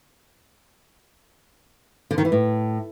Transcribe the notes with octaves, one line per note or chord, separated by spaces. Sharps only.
D3
D#3
E3
A2